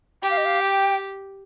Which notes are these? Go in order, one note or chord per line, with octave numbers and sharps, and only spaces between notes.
G4 G5
F5
D#5
F5
G5